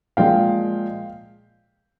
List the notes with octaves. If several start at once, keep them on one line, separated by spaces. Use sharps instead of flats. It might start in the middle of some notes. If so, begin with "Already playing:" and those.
A#2 F3 G#3 F5 G5